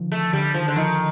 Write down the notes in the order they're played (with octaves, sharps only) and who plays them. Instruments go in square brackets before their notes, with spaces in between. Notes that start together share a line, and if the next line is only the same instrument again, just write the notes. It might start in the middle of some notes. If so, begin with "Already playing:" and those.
Already playing: [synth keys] D3 D#3 F3
[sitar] A3
[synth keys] D3 [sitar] G3
[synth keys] D#3 [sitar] F3
[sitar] D3
[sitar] D#3 [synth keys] F3